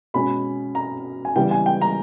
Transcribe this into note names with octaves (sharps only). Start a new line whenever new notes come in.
B2 G#3 C#4 B5
A#5
G#5
C#3 E3 G3 B3 G5
G#5
G5
A#5